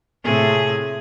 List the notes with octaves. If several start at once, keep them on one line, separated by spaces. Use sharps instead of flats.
A2 C3 G#4